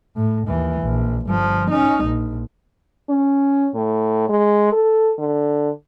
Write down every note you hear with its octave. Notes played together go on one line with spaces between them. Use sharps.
A2
D#2 E3
A#1
G1 F3
C#4 D#4
A#1
C#4
A2
G#3
A4
D3